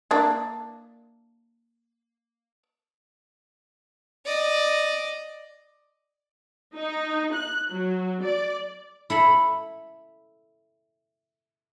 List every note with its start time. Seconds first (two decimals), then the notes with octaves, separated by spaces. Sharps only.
0.11 A#3 D4 E4
4.25 D5 D#5
6.75 D#4
7.34 F#6
7.70 F#3
8.23 D5
9.10 E4 A4 B5